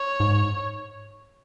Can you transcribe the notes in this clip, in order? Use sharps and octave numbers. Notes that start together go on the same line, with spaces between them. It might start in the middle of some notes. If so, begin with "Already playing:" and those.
Already playing: C#5
G#2